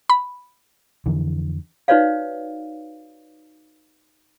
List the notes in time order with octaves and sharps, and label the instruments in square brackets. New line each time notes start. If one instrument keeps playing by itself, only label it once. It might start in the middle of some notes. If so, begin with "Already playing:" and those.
[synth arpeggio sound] B5
[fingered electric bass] F2 D3 E3
[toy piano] D#4 F#4 B4 C#5 D5 F5